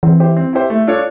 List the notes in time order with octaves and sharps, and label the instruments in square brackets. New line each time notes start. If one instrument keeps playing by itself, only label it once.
[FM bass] E3 [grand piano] C4
[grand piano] E4 G4 C5
C4
E4 G4 C5
A3
D4 F4 A4 C#5